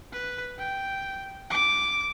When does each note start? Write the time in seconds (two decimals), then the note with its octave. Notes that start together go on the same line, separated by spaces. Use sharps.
0.12 B4
0.58 G5
1.51 D6